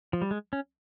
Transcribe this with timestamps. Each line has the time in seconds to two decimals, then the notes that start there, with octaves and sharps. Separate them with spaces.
0.13 F3
0.22 G3
0.31 G#3
0.53 C#4